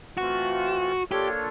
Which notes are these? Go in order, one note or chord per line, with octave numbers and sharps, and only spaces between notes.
E3 A3 C4 F4 F#4
A#3 D4 F4 G4 A4 C#5